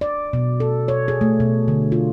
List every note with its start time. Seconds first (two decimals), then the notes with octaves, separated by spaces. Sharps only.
0.01 D5
0.33 B2
0.60 A4
0.88 C#5
1.08 G#4
1.21 A3
1.40 B2
1.68 D3
1.92 F4